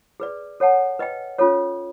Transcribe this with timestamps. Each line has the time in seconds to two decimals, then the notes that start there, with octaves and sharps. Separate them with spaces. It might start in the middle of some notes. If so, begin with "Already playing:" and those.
0.20 G#4 B4 D5
0.60 A4 C#5 F#5 A5
0.99 B4 D#5 G5
1.38 C#4 F4 A4 C#5